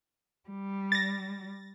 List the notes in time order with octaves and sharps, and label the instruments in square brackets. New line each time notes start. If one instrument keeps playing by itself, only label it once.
[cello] G3
[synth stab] A6 A#6